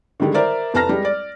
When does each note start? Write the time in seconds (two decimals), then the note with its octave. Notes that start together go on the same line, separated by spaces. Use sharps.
0.20 D3 D#3 G3 G#3
0.34 A#4 C5 D5 E5
0.74 F1 B4 A5 A#5 F6 A#6
0.89 G3 G#3
1.05 D5